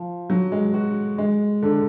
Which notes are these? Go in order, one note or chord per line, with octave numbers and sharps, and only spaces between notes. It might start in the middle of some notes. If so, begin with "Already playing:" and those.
Already playing: F3
F#3
G#3
F#4
G#3
D3